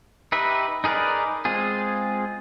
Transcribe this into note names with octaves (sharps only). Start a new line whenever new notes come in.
D#4 G4 B4 E5
D#4 G#4 A#4 B4 D5
G#3 C4 F4 G#4